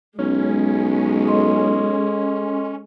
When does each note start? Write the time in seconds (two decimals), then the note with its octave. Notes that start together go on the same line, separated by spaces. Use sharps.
0.19 B1 G#3 C#4
1.28 A4 D#5 C6